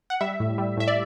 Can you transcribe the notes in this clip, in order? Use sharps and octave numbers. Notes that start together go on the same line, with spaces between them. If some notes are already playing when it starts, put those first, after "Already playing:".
F#5
G3 E5
A2
G3
A2 E5
D5